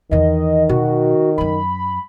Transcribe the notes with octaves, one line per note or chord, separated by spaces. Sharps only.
E2 D#3 E3 D#5
B2 F#4
F#2 F#3 B5